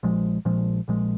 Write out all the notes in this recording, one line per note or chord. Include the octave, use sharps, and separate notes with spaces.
A#1 A#2 F3 G#3
A#1 A#2 F3 G#3
A#1 A#2 F3 G#3